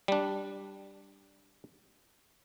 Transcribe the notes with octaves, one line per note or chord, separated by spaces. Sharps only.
G3 D4